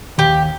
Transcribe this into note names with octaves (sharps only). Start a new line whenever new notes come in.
D#2 G4